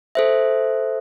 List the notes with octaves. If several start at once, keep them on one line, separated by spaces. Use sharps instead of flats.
A4 C5 E5